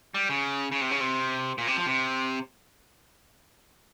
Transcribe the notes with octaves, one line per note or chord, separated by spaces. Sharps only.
G3
C#3
C#3
C3
C#3
C3
A#2
C3
F3
C3